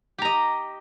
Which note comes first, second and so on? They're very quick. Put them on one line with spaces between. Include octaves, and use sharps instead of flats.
G4 A#5 D#5